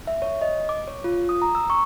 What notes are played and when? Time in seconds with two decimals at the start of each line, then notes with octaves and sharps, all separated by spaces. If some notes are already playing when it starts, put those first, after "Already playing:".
0.07 E5
0.22 C#5
0.41 D#5
0.69 D6
0.88 C#5
1.04 F4
1.29 D#6
1.42 A#5
1.55 E6
1.70 C#6